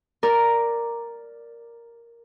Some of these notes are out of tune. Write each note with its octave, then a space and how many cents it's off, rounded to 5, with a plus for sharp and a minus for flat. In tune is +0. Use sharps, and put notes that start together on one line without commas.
A#4 +0 D5 +0